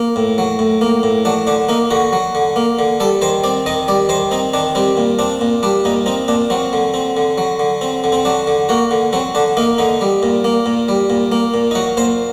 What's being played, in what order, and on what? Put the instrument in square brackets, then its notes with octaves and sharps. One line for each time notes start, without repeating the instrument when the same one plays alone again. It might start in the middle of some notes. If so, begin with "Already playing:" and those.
Already playing: [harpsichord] A#3
A2
F#3
A2
A#3
A2
F#3 D4
D3 D4
A#3 D#4
D3 F#4
F#3
D3
A#3
D3
G3 A4
D#3 C5
C4 D5
D#3 D#5
G3 D5
D#3 C5
C4 D#4
D#3 D4
G3 C4
A#2
C4 D4
A#2
G3 D4
A#2 D#4
C4 D#4
A#2 D4
F#3 C4
D3
C4
D3
F#3
D3
C4
D3
C4
F#3 D4
D3
A#3 F#4
D3
F#3 C4
D3 D4
A#3 D#4
D3 D#4
G3
A#2
A#3
A#2
G3
A#2
A#3
A#2
D#4
F#3 F#4
A#2 C5